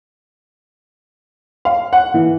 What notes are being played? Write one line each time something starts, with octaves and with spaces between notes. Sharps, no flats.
F5
F#5
E3